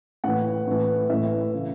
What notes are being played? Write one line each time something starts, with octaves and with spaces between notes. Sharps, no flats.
A2 E3 F#5
A2 E3
A2 E3 E5
C#3 E3